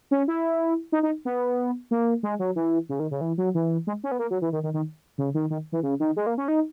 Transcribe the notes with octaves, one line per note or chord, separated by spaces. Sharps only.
C#4
E4
D#4
D#4
B3
A#3
G#3
F#3
E3
C#3
D#3
C#3
E3
F#3
E3
G#3
C#4
B3
A#3
F#3
E3
D#3
D#3
D#3
C#3
D#3
D#3
E3
C#3
D#3
G#3
A#3
C#4
D#4